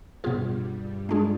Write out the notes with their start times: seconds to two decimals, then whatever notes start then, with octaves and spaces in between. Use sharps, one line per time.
0.23 G2 B2 G3 B3 F4 G#4
1.09 G#3 D4 F4 G#4